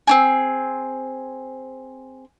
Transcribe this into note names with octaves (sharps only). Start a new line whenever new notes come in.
C4 D4 G#4